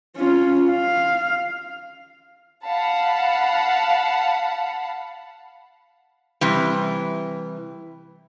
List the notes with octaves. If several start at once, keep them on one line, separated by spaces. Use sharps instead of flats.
C#4 F4
F5
F5 F#5 A5 B5
C3 E3 G3